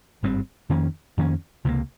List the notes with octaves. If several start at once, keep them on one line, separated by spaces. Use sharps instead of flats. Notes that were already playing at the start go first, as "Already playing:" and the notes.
G#1 G2 G3 C4
F2 D#3 A#3 C#4
F2 D#3 A#3 C#4
C#2 C3 F3 A#3